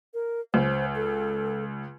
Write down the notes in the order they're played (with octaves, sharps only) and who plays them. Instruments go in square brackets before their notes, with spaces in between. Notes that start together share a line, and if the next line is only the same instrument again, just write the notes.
[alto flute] A#4
[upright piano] C#2 [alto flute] C5
[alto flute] A4